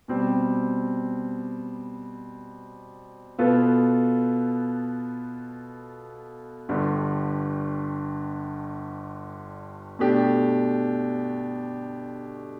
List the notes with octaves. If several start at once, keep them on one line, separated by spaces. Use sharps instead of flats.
B2 G3 C4
B2 B3 F4 A4
G1 G2 D3
B2 A3 D4 G4